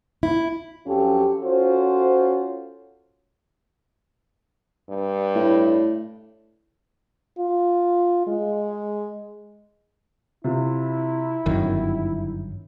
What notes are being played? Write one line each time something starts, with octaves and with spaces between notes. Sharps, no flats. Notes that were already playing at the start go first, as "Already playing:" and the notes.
E4
F2 F#3 C#4 F4 G4 A4
C#4 F4 F#4 A4 C5
G2
A2
F4
G#3
C3 E4 F4
G1 F#2 D#3 D#4